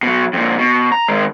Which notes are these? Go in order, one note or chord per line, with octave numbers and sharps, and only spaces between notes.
B2 F#3
F2 A#2
B2
A#5
D#3 G#3